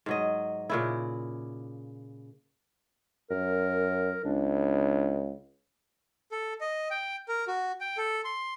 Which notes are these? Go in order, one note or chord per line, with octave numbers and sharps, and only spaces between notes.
G#2 F#3 D#5
A#2 C#3 E4
F#2 A#4
C#2 D4
A4
D#5
G5
A#4
F#4
G5
A4
C6